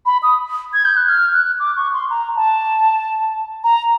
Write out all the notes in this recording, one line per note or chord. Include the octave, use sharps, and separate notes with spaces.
B5
D#6
G#6
G6
F#6
F6
F#6
D6
C#6
C6
A#5
A5
A#5